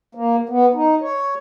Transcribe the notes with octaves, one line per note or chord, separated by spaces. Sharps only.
A#3
B3
D#4
C#5